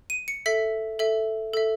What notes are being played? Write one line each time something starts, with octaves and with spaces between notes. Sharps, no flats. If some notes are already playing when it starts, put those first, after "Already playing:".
D#7
C#7
A4 E5 B6
A4 E5
A4 E5